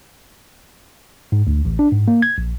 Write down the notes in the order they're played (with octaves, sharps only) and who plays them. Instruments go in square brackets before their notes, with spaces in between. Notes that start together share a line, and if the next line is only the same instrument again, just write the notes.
[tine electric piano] G#2
D2
A1
D4
G#2
A#3
G#6
A#1